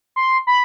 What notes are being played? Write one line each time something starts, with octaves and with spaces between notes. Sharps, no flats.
C6
B5